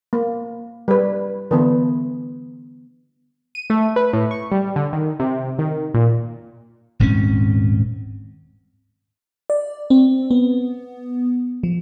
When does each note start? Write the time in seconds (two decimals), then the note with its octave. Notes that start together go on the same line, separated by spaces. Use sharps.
0.13 A#3
0.88 G3 B4
1.51 D3 E3 B3
3.55 D#7
3.70 A3
3.96 B4
4.13 A2
4.31 C#6
4.52 G3
4.76 D3
4.93 D#3
5.20 C3
5.59 D#3
5.94 A#2
7.00 D#1 G#2 C4 C#4
9.50 D5
9.90 C4
10.31 B3
11.63 F3